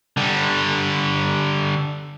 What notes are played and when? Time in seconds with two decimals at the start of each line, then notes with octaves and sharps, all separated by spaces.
0.17 D3 G3